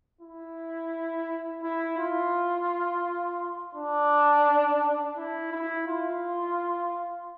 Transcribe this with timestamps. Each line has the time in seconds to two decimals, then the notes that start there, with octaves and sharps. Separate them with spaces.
0.21 E4
1.63 E4
1.98 F4
3.75 D4
5.16 E4
5.52 E4
5.87 F4